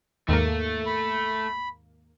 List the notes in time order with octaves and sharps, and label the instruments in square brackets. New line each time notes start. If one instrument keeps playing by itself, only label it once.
[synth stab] D#2 G#2 A#3 [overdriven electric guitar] A3
[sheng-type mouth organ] B5